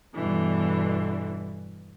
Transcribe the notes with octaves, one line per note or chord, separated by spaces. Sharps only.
E2 G2 B2 D3 E3